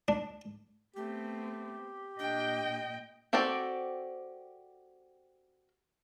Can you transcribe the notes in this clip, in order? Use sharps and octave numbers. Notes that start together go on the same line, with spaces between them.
D4
A3 B3 C4 G4
A#2 D4 D#5 G5
C4 F#4 G4 A4 D5